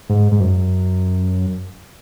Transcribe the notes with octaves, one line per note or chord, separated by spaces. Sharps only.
G#2
G#2
F#2